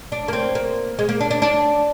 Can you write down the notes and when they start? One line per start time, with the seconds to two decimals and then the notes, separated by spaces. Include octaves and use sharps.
0.12 D4
0.28 A#3
0.33 C4
0.55 A#3
0.99 G#3
1.09 A#3
1.21 D4
1.31 D4
1.42 D4